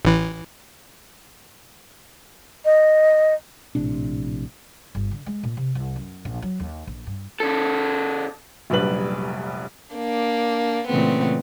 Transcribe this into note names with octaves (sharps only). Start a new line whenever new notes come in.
A1 E3
D#5
A#1 A2 C3 D4
G1
D3
G#3
A#2
C3
C2
F#2
A#1
F#3
D#2
A#1
G2
C#3 A4
F1 A#1 F#3 G3 B4 F#7
A#3 D4
A#2 C#3 E3 A3 B3 C4